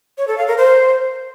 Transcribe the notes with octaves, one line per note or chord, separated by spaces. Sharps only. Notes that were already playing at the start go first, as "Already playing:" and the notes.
C#5
A4
F5
A#4
C5